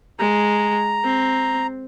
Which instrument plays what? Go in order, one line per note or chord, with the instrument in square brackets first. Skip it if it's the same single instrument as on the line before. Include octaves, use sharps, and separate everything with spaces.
[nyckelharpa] G#3 [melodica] A#5
[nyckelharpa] C4